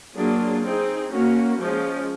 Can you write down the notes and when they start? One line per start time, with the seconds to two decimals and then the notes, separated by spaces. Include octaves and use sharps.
0.16 F#3 A#3 D4 F4 G#4
0.63 C4 D#4 G#4
1.11 A#3 C#4 F#4
1.58 F3 G#3 C#4